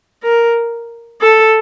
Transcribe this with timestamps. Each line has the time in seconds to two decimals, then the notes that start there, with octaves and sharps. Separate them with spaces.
0.24 A#4
1.21 A4